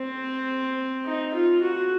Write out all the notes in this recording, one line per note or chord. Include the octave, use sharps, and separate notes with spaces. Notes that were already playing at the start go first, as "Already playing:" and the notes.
Already playing: C4
D#4
F4
F#4